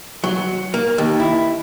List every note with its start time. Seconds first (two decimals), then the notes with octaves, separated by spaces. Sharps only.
0.24 F#3
0.74 A#3
0.98 D#2
1.20 E4